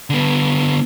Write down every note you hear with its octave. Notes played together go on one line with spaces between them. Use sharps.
D3 B3